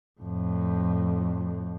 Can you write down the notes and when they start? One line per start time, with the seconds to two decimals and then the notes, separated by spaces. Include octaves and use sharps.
0.20 F2 A2